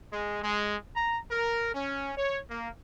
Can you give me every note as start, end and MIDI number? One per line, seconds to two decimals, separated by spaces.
0.12 0.39 56
0.43 0.77 56
0.96 1.18 82
1.31 1.71 70
1.75 2.13 61
2.17 2.38 73
2.50 2.69 58